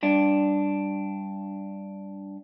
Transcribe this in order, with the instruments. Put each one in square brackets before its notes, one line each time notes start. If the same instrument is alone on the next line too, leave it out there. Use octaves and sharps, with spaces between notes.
[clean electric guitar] G2 D4